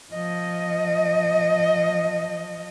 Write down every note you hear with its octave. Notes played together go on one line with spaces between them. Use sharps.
F3 D#5